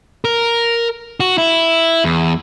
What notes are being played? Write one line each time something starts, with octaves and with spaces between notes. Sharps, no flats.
A#4
F#4
E4
E2